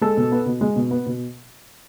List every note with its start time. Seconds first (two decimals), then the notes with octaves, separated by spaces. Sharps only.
0.01 G#3 A4
0.17 B2
0.32 B3
0.46 B2
0.61 G#3
0.76 B2
0.91 B3
1.06 B2